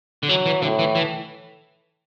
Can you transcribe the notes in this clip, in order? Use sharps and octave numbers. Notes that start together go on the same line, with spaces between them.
D3
E3 F#3
E3
A2 D3
E3
E3